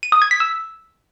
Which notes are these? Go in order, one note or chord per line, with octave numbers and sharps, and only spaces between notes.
D#7
D#6
G#6
B6
E6